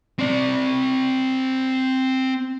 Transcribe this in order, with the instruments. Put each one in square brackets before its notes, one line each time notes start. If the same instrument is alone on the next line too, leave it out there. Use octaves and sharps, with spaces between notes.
[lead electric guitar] C4 D5